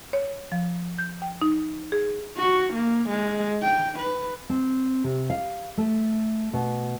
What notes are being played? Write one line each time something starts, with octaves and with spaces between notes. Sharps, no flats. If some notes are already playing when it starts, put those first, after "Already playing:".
C#5
F3
G6
G5
D#4
G#4
F#4
A#3
G#3
G5
B4
C4
C3
F5
A3
B2